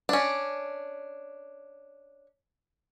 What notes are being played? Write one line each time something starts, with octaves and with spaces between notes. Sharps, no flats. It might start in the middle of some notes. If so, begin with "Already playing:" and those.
C#4 D4